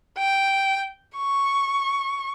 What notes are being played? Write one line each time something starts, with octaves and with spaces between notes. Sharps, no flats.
G5
C#6